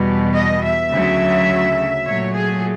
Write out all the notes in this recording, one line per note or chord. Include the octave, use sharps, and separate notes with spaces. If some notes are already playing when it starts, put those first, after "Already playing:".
Already playing: E2 B2 G3
D#5
E5
D2 C#3 F#3
A#2 F#3 A3 C#5
G#4